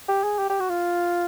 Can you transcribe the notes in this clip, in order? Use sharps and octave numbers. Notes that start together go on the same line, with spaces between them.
G4
G#4
G4
G4
F#4
F4